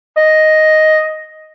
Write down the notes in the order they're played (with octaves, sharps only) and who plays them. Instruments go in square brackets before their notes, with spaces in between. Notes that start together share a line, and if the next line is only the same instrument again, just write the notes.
[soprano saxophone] D#5